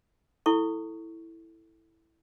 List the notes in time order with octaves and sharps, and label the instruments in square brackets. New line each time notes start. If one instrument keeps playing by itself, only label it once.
[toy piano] E4 A4 C#6